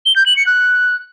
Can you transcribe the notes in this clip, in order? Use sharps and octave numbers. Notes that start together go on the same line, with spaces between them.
G7
G6
F#7
C#7
F#6